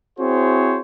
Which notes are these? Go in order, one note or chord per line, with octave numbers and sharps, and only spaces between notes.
C4 E4 F#4 G#4 C5 C#5